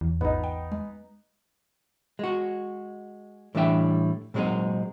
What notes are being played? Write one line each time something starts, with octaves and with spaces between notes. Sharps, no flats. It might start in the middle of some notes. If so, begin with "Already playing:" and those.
E2
A1 G#2 B3 D#4
G5
G#3
G#3 F#4
A2 E3 G3 D4 E5 G5
A#2 F#3 G#3 C4 D#4